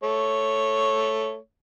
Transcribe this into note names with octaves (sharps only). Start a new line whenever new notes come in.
A3 C#5